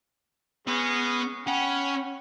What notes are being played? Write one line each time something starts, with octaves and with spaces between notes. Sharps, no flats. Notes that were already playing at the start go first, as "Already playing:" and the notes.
G#3 B3 C#4
C#4 F#5 G5 B5